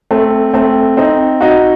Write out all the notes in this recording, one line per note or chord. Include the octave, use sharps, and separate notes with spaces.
A3 C4
A3 C4
C4 D#4
D#4 F#4